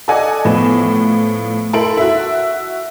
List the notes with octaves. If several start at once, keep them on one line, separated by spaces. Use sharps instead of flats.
A4 D5 D#5 F#5 G#5 D6
A2 F3 B3 E7
E4 A4 A#4 C6 D7 F#7
F#4 E5